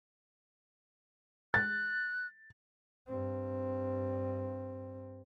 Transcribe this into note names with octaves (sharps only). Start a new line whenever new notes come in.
F#6 A6
G2 C4